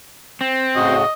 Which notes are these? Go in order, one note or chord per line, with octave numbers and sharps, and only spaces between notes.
C4
A2 C#3 F#4 D#5